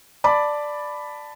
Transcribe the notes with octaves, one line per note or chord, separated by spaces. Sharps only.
D5 A5 B5 D6